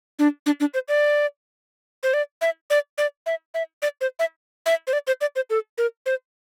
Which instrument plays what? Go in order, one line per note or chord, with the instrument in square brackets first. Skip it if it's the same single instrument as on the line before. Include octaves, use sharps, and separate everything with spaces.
[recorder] D4
D4
D4
C5
D5
C5
D5
E5
D5
D5
E5
E5
D5
C5
E5
E5
C5
D5
C5
D5
C5
A4
A#4
C5